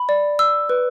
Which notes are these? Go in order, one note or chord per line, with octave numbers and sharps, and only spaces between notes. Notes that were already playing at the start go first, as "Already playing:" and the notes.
Already playing: B5
D5
E6
B4